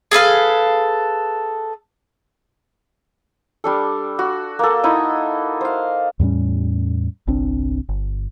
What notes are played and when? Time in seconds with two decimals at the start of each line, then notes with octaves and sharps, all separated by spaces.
0.11 G#4 A4 B4 F5
3.64 G3 D4 A4
4.19 F#4
4.59 A#3 A4
4.83 D#4 E4 D#5
5.61 C5 F5
6.19 E2 A2 G3 C#4
7.27 G1 C2 C4 D4
7.89 G1